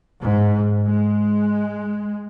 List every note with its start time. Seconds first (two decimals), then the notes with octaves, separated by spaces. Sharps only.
0.21 G#2
0.84 G#3